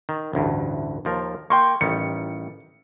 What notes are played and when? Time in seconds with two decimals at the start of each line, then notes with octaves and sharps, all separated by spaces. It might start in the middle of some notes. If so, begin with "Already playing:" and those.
0.09 D#3
0.33 A1 D2 G2
1.05 D#2 F3 A#4
1.50 A#3 G5 C6 C#6
1.81 A1 D#3 G3 C#7